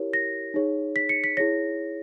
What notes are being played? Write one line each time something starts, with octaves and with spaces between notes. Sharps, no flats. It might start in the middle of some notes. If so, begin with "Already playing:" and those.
Already playing: E4 G4 A#4 C#5
A#6
D#4 G#4 C#5
B6
C#7
B6
E4 G#4 C#5 A#6